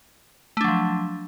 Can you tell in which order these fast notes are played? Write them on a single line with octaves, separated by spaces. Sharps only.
A3 D4 F#3 F3